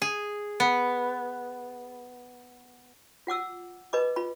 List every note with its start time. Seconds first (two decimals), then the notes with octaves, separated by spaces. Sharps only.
0.02 G#4
0.60 B3
3.27 F4 F#5 D6 E6
3.93 B4 D#5 B5 D6
4.16 F4 B5